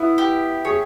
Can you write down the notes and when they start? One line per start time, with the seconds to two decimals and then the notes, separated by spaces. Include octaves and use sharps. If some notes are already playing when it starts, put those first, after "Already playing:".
Already playing: B3 E4
0.18 G4
0.65 G#4 C#5